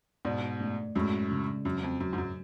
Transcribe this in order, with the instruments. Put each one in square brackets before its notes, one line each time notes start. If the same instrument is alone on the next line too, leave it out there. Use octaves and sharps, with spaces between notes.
[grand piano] G#2 B2 [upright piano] D5
[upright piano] A3
[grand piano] F#2 A2 [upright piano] G#3
[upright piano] C#3
[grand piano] F#2 [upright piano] F#3
[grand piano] F2
[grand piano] F#2 [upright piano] F#3
[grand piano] G#2
F#2